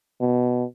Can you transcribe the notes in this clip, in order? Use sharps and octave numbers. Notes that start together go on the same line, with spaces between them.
B2